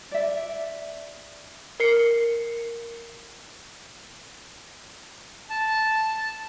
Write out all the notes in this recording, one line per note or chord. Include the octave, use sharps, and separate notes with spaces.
D5 E5
A#4 C7 C#7
A5